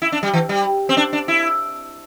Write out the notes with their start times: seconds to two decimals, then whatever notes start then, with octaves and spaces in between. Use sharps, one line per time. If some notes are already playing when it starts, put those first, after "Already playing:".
0.02 E4
0.12 D4
0.23 G3
0.34 E3
0.49 G3
0.89 C4
0.97 D4
1.13 D4
1.28 E4